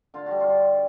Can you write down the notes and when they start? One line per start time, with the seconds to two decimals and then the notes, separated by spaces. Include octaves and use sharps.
0.14 D3 F4
0.26 G3 F#4
0.40 F4
0.47 G2